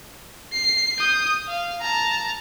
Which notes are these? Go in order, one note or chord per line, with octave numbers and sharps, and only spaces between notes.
C7
D#6 G6
F5
A5 A#5